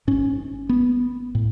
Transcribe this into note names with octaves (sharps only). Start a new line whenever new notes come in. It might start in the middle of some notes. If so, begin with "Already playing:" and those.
G#1 G#2 C#4
B3
A2